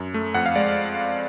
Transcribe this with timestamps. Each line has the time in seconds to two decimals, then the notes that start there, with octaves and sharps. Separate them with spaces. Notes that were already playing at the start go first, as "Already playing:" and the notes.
Already playing: F#2
0.14 A3
0.34 F2 F#5
0.46 F5
0.55 G#3 D5